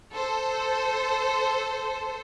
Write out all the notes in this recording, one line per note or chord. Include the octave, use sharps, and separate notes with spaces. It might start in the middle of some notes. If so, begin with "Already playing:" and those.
A4 C5